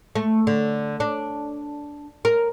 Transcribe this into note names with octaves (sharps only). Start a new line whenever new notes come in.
A3
D3
D4
A#4